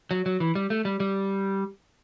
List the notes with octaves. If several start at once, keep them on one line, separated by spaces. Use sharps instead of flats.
F#3
F#3
E3
G3
A3
G3
G3